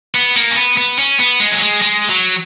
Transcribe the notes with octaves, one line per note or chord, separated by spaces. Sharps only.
B3
A#3
C#4
B3
B3
C#4
B3
G#3
F#3
G#3
G#3
F#3